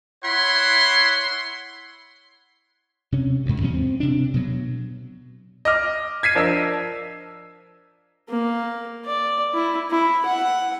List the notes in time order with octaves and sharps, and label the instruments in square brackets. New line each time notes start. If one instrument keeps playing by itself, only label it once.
[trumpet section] E4 C#5 F#5 B5 C6
[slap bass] C3 C#4
D2 G#2
E2 B2 F#3 C#4
C4
C3 D4
B2 F#3
[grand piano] D#5 D6 F6
G#6 B6 C7 D#7
F3 D4 A#4 D#5 E6
[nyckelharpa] A#3
D5
E4
E4
F#5